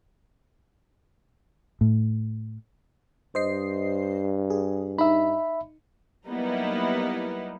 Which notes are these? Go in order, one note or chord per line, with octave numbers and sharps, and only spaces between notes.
A2
G2 C5 D#5 C7
G#4
D#4 E5 B5
F#3 G3 A#3 B3 D#4 E4